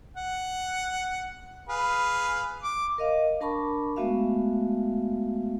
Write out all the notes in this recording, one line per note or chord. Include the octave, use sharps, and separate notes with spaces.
F#5
G#4 B4 F5
D6
A#4 D#5 F5
D4 A#4 A5 B5 C#6 D6
G#3 A3 B3 F#4 E5 F5